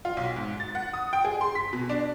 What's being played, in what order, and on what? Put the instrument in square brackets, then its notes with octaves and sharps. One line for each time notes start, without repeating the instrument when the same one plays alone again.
[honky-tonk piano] F4
B1
G#2
A6
F#5
D#6
G5
G#4
C6
B6
B2
D4